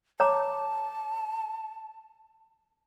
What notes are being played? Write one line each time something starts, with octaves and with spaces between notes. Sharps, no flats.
C#5 A5 A#5 D6